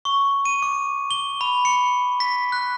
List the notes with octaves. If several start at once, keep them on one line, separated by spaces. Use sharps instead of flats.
C#6
D#7
D6
G7
B5
C#7
B6
F#6